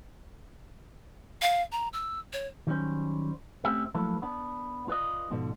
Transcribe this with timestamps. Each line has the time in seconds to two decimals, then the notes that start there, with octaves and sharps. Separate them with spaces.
1.42 F5
1.72 A#5
1.93 E6
2.33 C#5
2.67 D#3 F#3 G3 A#3 C#4 C5
3.65 A3 C4 C#4 G4 E5
3.94 F3 F#3 A3 A#3 E4 B4
4.22 B3 D4
4.88 F4 B4 D5 D#5
5.31 G#2 B2 D3 F3